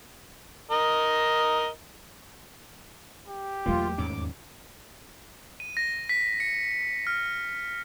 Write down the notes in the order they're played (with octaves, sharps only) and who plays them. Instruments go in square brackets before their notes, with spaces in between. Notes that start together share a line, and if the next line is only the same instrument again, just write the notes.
[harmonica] A#4 D#5
[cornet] G4
[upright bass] E2 A3 [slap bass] F#3 A#3 [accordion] F4
[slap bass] D#2 G#2 C#4 [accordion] D6
[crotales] D#7
A#6
B6
C#7
F6